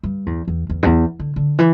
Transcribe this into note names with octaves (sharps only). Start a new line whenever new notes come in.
G2
E2
E2
E2
G2
E2
D3
D3
E3